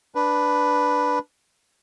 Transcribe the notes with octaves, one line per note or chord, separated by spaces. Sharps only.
D4 B4